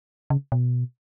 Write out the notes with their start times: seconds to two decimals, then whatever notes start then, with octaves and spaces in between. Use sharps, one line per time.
0.30 C#3
0.52 B2